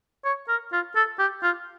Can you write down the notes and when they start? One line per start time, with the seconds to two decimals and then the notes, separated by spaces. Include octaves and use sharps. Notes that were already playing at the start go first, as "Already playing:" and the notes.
0.25 C#5
0.48 A#4
0.73 F4
0.96 A4
1.19 G4
1.43 F4